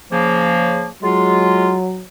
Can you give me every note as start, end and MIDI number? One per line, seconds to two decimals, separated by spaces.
0.11 0.88 49
0.11 0.88 53
0.11 0.88 58
1.03 2.04 54
1.03 1.75 56
1.03 1.75 65